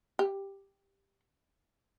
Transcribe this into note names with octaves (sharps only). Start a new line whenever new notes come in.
G4